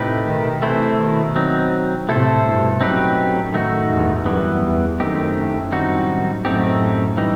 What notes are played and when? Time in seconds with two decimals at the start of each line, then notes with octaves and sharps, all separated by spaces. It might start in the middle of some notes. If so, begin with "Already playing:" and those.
Already playing: A2 C3 A3 D#4 G4 B4
0.26 B2 D#3
0.62 C3 E3 A3 E4 A4 C5
0.99 B2 D#3
1.36 F#3 C4 D#4
2.08 A2 C3 A3 E4 A4 C5
2.44 G2 B2
2.81 F#2 A2 F#3 C4 D#4 G4 B4
3.54 D#3 A3 D#4 F#4
3.90 E2 G2
4.26 F#2 E3 G3 B3
4.63 E2
4.99 F#2 D#3 A3 C4 D#4 G4
5.35 F#2 A2
5.72 D#3 G3 C4 D#4 F#4
6.44 F#2 A2 A3 C4 D#4 G4
7.17 E3 G3 D#4